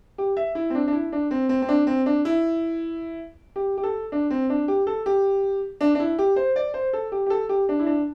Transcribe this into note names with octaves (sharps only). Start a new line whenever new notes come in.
G4
E5
E4
C4
D4
D4
E4
D4
C4
C4
C4
D4
C4
D4
E4
G4
G4
A4
D4
C4
D4
G4
A4
G4
D4
D4
E4
G4
C5
D5
C5
A4
G4
G4
A4
G4
D4
E4
D4